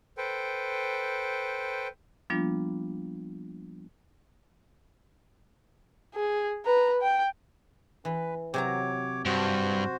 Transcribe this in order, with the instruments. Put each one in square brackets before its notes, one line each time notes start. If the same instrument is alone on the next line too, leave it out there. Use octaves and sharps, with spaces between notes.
[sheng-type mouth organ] A4 B4 C5 G5
[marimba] F3 G3 A#3 B3 D4 F4
[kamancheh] G#4
B4 A#5
G5
[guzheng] E3 [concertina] B4
[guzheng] C3 F#3 A#5 [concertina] C#5 D6
[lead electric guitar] G2 [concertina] F#4 C5